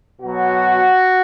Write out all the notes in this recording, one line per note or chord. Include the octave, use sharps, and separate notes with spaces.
B2 F#3 F#4